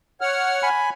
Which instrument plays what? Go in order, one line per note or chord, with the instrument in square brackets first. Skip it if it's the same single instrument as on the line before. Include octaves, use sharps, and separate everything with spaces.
[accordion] C#5 F#5 F6
[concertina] G#5 B5